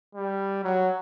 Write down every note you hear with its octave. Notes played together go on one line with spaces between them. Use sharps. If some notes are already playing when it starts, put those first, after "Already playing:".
G3
F#3